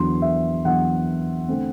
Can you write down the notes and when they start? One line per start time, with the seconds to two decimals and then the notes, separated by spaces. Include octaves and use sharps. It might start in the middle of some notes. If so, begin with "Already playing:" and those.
Already playing: E2 D3 F#3 B3 C6
0.22 E5
0.65 E2 D3 F#3 B3 F#5
1.48 D3 A3 C4